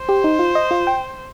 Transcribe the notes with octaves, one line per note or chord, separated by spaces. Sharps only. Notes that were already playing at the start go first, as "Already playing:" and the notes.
Already playing: C5
G4
D#4
F4
D#5
F4
G5